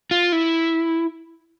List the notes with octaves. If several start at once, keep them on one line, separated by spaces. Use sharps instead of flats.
F4
E4